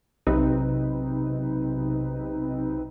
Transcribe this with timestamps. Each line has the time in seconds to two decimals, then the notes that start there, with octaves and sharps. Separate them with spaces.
0.27 B1 C3 C4 D#4 B4